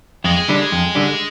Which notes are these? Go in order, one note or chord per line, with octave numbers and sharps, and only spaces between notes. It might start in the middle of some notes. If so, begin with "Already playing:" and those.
F2 G#3
D3 G3 D4
F2
D3 G3 D4